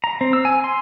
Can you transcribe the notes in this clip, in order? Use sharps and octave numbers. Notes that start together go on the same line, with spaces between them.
A#5
C4
E6
G#5
C6